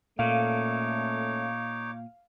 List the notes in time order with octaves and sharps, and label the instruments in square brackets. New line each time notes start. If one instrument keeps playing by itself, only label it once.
[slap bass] A#2 [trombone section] A3 C#4 A4 [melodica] D#4 C#5 D6 [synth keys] F5